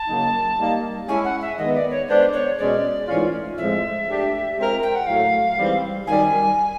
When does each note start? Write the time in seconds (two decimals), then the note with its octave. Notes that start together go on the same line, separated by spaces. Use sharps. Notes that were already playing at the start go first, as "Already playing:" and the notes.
Already playing: A5
0.08 C#3 F#3 A#3 D#4
0.58 G3 A#3 D#4
1.08 G#3 C#4 E4 G#5
1.24 F#5
1.41 E5
1.58 D#3 G#3 B3 D#5
1.75 D5
1.91 C#5
2.08 G#3 B3 D4 C5
2.33 C#5
2.57 B2 G#3 C#4 D5
3.08 G#2 E3 A3 C#4 F4
3.57 A2 F3 G#3 C4 E5
4.07 A3 D4 G4
4.57 G#3 C4 F4 A#4
4.83 G5
4.95 F#5
5.07 A2 F#3 A3 F5
5.57 G#2 E3 G3 C4
6.07 F#2 D#3 G3 G#5